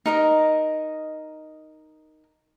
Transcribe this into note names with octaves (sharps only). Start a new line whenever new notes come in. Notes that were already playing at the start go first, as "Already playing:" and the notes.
D#4 A#4 D#5